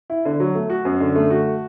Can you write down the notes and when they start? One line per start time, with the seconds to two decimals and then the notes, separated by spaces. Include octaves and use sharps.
0.10 E4
0.25 D3
0.40 F#3
0.55 A3
0.70 F#4
0.85 F#2
1.00 D3
1.15 A3
1.30 F#4